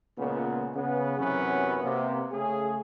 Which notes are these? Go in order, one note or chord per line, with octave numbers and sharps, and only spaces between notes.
C#2 A#2 C#3 B3
C#3 B3
F#2 C3 E3 F#3 B3 C#4
C3 A#3 B3
C#3 A3 C#4 G#4